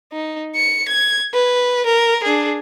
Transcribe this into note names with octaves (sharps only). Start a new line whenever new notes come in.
D#4
C#7
G#6
B4
A#4
D4 G#4